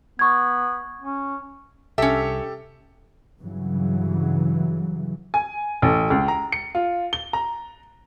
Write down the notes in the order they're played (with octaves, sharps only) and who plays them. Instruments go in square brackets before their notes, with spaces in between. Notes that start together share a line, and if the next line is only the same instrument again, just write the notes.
[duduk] B3 [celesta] C#6 G#6
[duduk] C#4
[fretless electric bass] C2 [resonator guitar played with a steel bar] C#4 E5 [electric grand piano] G4 A4
[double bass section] G2 C#3 E3 F#3
[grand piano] G#5
A1
C#2
A#5
C#7
F4
G7
A#5